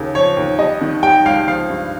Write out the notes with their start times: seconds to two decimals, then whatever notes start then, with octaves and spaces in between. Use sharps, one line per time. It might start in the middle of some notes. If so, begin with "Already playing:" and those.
Already playing: D#2 C#3
0.15 F3 C#5
0.37 D#2
0.59 G3 D#5
0.81 D#3
1.03 G3 G5
1.25 C#2 F5
1.47 F3 F5
1.69 G2